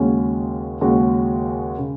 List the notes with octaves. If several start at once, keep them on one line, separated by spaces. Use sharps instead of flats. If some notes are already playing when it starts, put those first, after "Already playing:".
Already playing: D#2 C#3 G#3 C#4 F#4
D#2 C#3 G#3 C#4 F#4
C#3